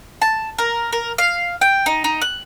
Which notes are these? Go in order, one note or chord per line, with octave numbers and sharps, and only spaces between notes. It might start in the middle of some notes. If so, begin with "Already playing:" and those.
A5
A#4
A#4
F5
G5
D#4
D#4
F#6